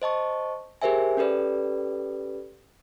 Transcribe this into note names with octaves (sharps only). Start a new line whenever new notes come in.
C5 D#5 A5 C#6
G4 G#4 A#4 C5 E5 G#5
C#4 G4 A4 B4 D5